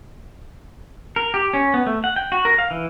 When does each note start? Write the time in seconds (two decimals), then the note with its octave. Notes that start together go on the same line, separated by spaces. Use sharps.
1.16 A#4
1.34 G4
1.53 C#4
1.74 B3
1.87 A3
2.04 F#5
2.16 G5
2.32 F#4
2.45 A#4
2.58 F5
2.71 E3